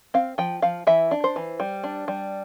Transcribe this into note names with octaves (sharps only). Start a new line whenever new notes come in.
C4 F5
F3 G5
F3 F5
E3 E5
D4
C5
E3
G3
D4
G3